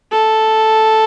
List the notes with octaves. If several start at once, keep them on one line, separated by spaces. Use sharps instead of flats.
A4